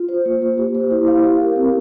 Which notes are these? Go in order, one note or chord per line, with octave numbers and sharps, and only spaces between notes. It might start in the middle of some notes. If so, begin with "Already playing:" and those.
Already playing: F4
C5
A#3
A#3
G4
C5
E4
F5
G4
A#4
C4